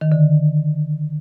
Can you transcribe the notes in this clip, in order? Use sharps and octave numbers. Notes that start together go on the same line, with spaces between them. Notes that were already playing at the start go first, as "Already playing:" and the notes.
D#3
D3